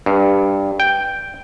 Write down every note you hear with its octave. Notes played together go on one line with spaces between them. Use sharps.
G2
G5